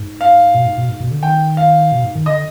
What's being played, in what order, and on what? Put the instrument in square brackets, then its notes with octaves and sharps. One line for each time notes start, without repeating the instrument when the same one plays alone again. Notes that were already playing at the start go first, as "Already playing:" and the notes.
Already playing: [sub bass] G#2
[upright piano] F5
[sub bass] B2
G#2
B2
G#2
B2
D3
[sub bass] D#3 [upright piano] G5
[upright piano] F5
[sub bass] B2
G#2
D#3
[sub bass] D3 [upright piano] D#5